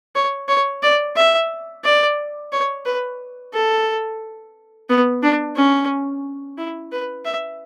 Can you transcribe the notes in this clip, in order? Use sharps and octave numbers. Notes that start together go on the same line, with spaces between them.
C#5
C#5
D5
E5
D5
C#5
B4
A4
B3
D4
C#4
E4
B4
E5